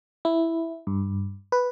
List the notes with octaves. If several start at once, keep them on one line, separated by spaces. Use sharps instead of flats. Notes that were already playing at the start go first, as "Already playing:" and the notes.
E4
G2
B4